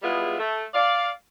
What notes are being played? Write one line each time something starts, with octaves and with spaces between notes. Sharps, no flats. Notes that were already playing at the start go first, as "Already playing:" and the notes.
G3 G#3 B3 E4 F4 G#4
A3
D5 F5